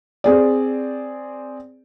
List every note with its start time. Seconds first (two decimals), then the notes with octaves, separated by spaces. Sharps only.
0.24 C4 G#4 D5